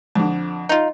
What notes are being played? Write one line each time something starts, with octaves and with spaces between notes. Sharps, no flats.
F2 D3
D#4 F4